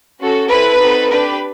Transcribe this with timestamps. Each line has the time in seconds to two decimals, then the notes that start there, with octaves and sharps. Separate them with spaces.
0.19 C#4 F#4 A4
0.49 C4 E4 A4 B4
0.79 C4 D#4 F#4 A4
1.09 D4 G4 B4